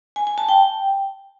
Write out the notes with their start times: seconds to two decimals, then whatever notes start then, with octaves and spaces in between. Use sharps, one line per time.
0.16 G#5
0.27 G#5
0.38 A5
0.49 G5